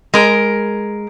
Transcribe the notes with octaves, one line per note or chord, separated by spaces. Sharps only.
G#3 A#4